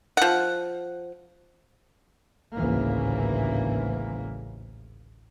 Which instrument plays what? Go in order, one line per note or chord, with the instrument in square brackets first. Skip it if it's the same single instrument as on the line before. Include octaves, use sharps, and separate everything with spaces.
[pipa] F3 F#5
[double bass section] A1 D2 G#2 C#3 E3 A#3